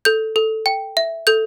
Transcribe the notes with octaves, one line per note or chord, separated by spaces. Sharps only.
A4 G6
A4
G5
E5
A4 G6